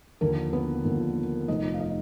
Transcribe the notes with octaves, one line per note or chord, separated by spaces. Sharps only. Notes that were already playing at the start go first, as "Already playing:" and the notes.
D#2 D3 F3 A#3 A#4
B3 B4
D#2 D3 F3
F1 F2 F3 D#4 D#5
F5
D#4 D#5